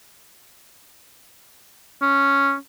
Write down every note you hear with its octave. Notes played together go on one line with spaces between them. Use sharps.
C#4